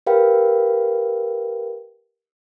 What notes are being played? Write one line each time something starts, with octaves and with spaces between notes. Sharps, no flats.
G4 A#4 B4 F5 G5